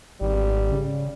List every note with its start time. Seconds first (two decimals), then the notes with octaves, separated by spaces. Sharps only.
0.21 G#1 G3
0.72 C#3